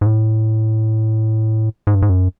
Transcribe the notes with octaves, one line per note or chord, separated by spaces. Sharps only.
G#2
A2
G#2
G2
G#2
F#2